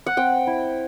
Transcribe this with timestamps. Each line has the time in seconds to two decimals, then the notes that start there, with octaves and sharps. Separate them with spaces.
0.06 F#5
0.17 C4 G5
0.47 E4